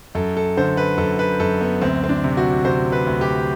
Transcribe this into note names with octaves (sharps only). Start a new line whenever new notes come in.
F#2 A4
A4
D3 C5
B4
F#2 A4
B4
F#2 A4
B3
D2 C4
C4
D4
C3
F#4
C3 C5
B4
D2
G4